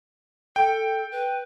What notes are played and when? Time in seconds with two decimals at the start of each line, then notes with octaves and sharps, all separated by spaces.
0.56 A4 G5
1.12 B4